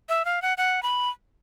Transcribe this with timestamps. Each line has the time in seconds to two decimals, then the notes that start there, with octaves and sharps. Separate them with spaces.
0.09 E5
0.25 F5
0.42 F#5
0.58 F#5
0.83 B5